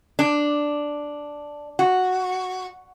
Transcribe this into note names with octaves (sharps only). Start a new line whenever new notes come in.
D4
F#4